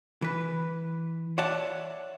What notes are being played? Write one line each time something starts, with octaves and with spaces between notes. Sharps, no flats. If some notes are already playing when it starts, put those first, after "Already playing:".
E3 B4
C#5 D5 E5 F#5 A5